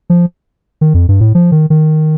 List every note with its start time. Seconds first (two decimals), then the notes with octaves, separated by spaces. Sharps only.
0.10 F3
0.81 D#3
0.94 F2
1.09 G2
1.21 A2
1.35 F3
1.52 D#3
1.70 D#3